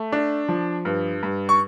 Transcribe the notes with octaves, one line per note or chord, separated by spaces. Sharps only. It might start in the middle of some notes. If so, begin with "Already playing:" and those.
Already playing: A3
D4
F3
G2
G2
C#6